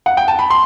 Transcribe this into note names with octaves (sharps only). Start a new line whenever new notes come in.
F#5
G5
A5
B5
C6